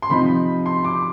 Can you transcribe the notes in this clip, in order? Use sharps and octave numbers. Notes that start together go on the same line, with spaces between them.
C6
C3 F3 C4 D#4 B5
C6
D6